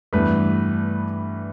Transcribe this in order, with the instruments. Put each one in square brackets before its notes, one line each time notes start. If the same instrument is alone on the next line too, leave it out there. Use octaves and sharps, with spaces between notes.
[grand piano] G2 E3 A3 B3 B4